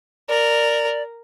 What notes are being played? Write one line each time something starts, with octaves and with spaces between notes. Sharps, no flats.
A#4 D5